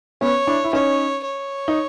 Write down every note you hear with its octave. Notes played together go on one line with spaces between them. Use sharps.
B3 C#4 C#5
D4 E4
E4
C#4 D#4 C#5
C#5
D#4